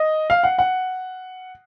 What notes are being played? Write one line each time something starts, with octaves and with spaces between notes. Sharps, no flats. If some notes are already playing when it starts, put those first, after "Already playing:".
Already playing: D#5
F5
F#5
F#5